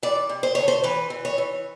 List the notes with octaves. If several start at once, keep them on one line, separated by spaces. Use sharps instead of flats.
E3 D5
C3
C5
D2 C#5
C5
E3 B4
E3
C#5
E3